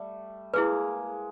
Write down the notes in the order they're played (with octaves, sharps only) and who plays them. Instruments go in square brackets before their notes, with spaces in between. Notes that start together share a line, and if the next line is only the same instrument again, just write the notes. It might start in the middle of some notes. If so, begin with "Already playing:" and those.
Already playing: [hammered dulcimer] G3 A3
[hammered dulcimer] G#3 A#3 [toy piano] E4 G#4 B4